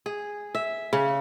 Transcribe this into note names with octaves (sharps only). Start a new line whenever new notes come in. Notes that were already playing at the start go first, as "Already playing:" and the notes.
G#4
E5
C#3